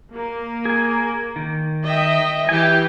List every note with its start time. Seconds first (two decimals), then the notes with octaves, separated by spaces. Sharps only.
0.13 A#3
0.65 G#4 G#5
1.36 D#3
1.83 D#5 E5 G5
2.49 E3 G4 G5 G#5